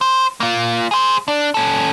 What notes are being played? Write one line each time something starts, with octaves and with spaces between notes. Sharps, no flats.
C5
A#3 F4
G#4 C5
D4
C#4 A4